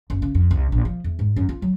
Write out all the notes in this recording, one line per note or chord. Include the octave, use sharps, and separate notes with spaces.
F#1
C#3
F2
C2
A#1
F3
E2
G#2
F#2
F4
F#3